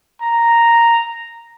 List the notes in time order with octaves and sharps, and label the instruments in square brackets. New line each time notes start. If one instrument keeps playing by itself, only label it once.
[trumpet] A#5